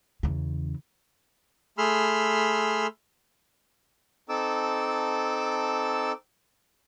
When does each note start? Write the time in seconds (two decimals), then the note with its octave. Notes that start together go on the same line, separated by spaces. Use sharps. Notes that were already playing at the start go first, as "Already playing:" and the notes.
0.23 E2 C#3
1.78 A3 G#4 B5 C6 E6 F6
4.29 C4 D#4 A4 A5 D6 E6